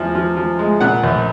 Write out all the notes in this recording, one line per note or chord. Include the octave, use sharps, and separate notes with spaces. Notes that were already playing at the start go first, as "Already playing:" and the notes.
Already playing: E2 F3
F3
F3
G#3
A#2 F#5
A#1